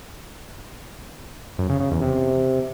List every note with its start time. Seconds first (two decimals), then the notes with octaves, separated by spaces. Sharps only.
1.58 F#2
1.69 C#3
1.80 C#3
1.91 E2
2.02 C3